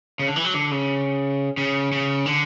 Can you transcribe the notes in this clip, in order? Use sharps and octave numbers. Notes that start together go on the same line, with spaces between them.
C#3
D3
E3
F#3
D3
C#3
C#3
C#3
D3